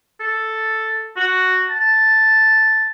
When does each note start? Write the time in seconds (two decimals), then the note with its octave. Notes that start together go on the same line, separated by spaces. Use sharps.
0.20 A4
1.16 F#4
1.69 A5